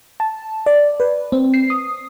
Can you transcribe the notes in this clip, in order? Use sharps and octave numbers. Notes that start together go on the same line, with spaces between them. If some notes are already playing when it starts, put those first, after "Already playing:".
A5
D5
B4
C4
C7
D#6